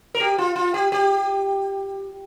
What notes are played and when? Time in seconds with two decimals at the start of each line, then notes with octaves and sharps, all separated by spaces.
0.14 A#4
0.20 G4
0.38 F4
0.56 F4
0.74 G4
0.92 G4